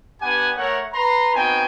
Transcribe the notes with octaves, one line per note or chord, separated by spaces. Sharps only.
B3 D4 G4 F#5 G#5
A3 A#4 C#5 E5 F#5
B4 A#5 C6
B3 C4 D#4 F#4 G5 G#5